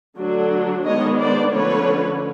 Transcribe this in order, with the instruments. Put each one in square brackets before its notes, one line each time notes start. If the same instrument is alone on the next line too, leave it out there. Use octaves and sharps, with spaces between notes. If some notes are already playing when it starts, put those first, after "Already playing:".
[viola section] D3 F#3 A3 D4
D#3 G#3 B3 D4 C#5 D#5
C5 D5
D3 F3 A3 C#4 B4 C#5